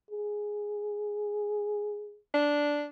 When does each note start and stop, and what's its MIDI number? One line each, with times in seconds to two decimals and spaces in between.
0.10 2.18 68
2.34 2.89 62